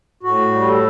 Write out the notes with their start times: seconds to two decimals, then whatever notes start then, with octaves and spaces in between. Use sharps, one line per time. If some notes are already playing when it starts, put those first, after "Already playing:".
0.23 A2 F#4
0.53 G3
0.68 A4